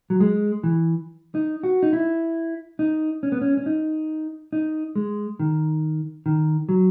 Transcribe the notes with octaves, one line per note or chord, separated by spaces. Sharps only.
F#3
G#3
E3
D#4
F#4
D#4
E4
D#4
C#4
B3
C#4
C#4
D#4
D#4
G#3
D#3
D#3
F#3